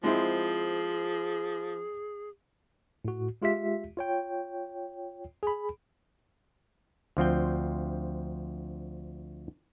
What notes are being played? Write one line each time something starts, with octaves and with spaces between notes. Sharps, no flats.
F3 G#3 C4 E4 G#4
A2 F#4
G#3 F4 G4 E5 B6
F4 C#5 G5
G#4 B5
D2 F3 C4 G5